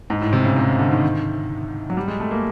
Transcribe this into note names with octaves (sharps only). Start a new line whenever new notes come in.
G#2
A2
C3
C#3
C3
C#3
D3
D#3
F#3
G3
G#3
A3
A#3